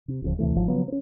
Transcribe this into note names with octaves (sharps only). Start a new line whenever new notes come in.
C3
D1 C#2 F3
D2 C3 E3 A3
G#1 G#2 F3 F#3
C#3 F3 F#3 B3
C4 C#4